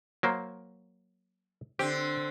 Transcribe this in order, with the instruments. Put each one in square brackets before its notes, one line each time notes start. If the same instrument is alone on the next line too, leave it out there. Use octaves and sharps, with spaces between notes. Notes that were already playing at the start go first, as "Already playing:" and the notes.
[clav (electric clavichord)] F#3 A#3 C5
[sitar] D3 C4 [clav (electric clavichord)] G4